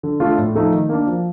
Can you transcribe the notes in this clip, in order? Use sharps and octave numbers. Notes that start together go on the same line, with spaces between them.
D3
A3 D4 F4
A2
F3 A3 D#4
D#3
A#3 D4
F3